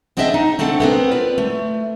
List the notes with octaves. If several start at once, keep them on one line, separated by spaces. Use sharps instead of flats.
B3 C4 D4 G#4 D#5 E5
D#4
A3 C4 D4 A4 F#5
B3 C4 A#4
F4 B4 D5
A3